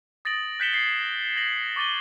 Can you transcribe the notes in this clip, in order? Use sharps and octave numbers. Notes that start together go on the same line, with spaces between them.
D#6 A6 A#6 D7 F#7
F#6 G6 B6 C#7 E7 G7
G#6 C7
G6 G#6 A#6 F#7
C#6 D6 A6 D#7 G7